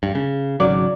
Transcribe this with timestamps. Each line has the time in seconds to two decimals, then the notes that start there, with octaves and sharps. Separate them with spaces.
0.03 G2
0.15 C#3
0.60 G#1 C#3 F#3 D5